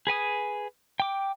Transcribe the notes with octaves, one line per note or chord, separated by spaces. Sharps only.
G#4 B4 G#5 D#6
G5 D6